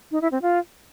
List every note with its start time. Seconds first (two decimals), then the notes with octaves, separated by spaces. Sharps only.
0.11 D#4
0.22 E4
0.32 C4
0.42 F4